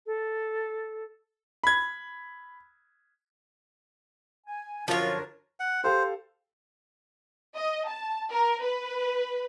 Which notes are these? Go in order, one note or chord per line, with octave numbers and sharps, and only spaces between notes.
A4
B5 G#6
G#5
F#2 D3 F3 D4 F4 A#4 C#5
F#5
G4 A4 C5 F5
D#5
A5
A#4
B4